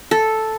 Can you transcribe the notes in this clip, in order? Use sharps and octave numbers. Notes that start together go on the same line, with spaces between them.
A4